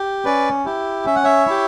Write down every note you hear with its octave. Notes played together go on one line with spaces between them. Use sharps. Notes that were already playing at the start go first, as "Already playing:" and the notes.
Already playing: G4
C#4 B4 D5
E4 G4
C#4 E5
F#5
C#5 E5
E4 G4